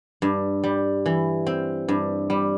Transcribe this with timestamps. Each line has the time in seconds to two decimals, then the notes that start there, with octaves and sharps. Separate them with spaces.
0.22 G2
0.64 G3
1.06 E3
1.47 C4
1.88 G2
2.30 G3